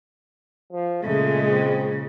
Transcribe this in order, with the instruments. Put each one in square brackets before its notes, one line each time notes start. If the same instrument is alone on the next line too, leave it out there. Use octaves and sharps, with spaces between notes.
[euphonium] F3
[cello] A#2 C#3 [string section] G#3 [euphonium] A3
[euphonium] C4